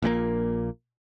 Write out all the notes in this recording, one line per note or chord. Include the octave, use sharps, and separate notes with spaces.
A#1 A#2 D3 A#3